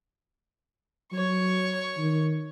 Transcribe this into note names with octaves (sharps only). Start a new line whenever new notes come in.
F#3 C#5 C#6
D#3